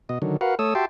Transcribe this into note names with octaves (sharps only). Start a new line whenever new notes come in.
B2 D#5
D3 D#3 F#3
F#4 A#4 B4 F5 F#5
A3 A4 C#5 D#6 E6
F#4 G4 E5 G5 A5 C6